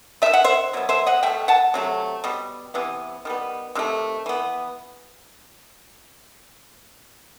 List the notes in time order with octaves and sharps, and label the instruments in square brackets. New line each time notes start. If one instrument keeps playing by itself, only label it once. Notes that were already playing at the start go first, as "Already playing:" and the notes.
[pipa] D#3 A3 E5
F#5
C5 E5
B2 F#3 B3
C5 E5
D#5 F#5
B2 A3 E5 G5
F#5 A5
C3 F#3 A3
B2 G3
C3 E3 B3
D#3 G3 B3
C3 D#3 A3
E3 B3